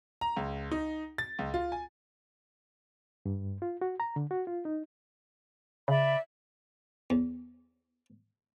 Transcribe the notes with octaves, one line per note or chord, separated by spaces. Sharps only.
A#5
C#2
D#4
A6
C#2
F4
G#5
G2
F4
F#4
A#5
D3
F#4
F4
D#4
C#3 D5 E5 B5
E2